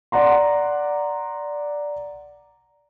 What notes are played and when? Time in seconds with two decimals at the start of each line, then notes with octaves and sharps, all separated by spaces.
0.12 D5 F#5 A#5 C6